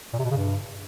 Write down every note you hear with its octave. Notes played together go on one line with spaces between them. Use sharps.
A#2
C3
B2
C#3
G2